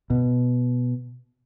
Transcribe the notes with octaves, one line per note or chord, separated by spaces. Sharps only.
B2